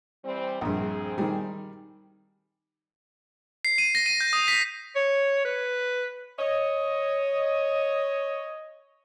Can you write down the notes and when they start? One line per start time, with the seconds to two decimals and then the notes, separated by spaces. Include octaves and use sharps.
0.24 E3 G3 C4
0.61 A#1 G2 C4 G#4
1.18 D#3 G3
3.65 C7
3.78 D#7
3.95 A#6
4.06 D#7
4.21 G6
4.33 D#6
4.48 B6
4.95 C#5
5.45 B4
6.39 C#5 D#5